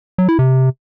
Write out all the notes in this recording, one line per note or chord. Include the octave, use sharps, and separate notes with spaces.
F#3
E4
C3